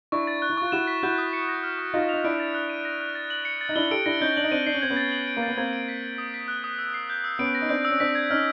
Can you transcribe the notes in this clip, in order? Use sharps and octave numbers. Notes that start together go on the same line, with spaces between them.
D4 E4 C#6
A6
F#6
E4
F4 C#6
E4 F#4 E7
B6
E4 F#4 G6
D#6
C#7
A#6
F6
C#6
D#4 F4 A6
D#4 F7
D4 E4 D7
A6
F#6
D#7
A#6
F#6
A6
F#7
C#7
A6
D#4
D4 E4 G7
G4 A4 D7
D4 E4 A#6
C#4 D#4 G6
D4 F#7
D#4
C4 D4 D#7
D4 C7
C#4
C4 G#6
B3 C#4
A6
F#7
D7
A#3
A6
B3
A#3 C4 G#6
D7
B6
G#6
D#6
B6
F#6
D#6
E6
C7
G6
E6
B3 C#4 D7
A#6
D#4
C4 D4 G6
E6
C#4
C4 D4 B6
G#6
C#4 D#4 F6